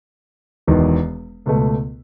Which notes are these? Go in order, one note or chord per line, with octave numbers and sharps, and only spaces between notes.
E1 E2 D#3
C#2 B2 A3